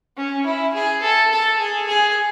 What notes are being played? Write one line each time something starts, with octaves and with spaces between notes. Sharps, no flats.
C#4
E4
G#4
A4
A4
G#4
G#4